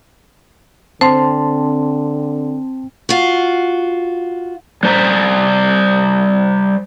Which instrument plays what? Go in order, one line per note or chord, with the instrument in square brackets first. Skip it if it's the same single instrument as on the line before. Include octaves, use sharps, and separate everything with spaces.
[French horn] D3 [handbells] C4 [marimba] C5 [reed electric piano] A5 C6
[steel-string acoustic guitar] F4 F#4
[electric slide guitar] G3 C5 A#5